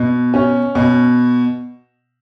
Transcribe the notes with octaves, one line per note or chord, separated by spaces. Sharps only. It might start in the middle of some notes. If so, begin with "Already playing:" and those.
Already playing: B2
C#4
B2